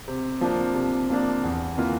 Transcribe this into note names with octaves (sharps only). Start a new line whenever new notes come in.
C3
F3 A#3 D4
C3
F3 A#3 D4
E2
E3 A#3 F4